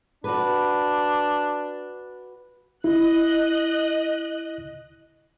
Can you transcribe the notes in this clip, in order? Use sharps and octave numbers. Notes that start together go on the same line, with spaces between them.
D4 F#4 B4
E4 D#5 F#6